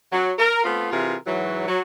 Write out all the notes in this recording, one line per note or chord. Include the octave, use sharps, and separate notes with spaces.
F#3
A#4
A3 B3 C4 F4
C3 E3 F4 G#4 A#4
G#2 E3 F#3
F#3